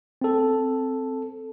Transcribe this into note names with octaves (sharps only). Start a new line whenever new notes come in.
C4 A4